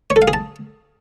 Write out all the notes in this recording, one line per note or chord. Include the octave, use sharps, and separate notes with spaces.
C#5
A4
F5
G#4
A5